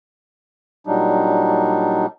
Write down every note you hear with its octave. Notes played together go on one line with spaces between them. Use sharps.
A#2 F#3 G3 D4 D#4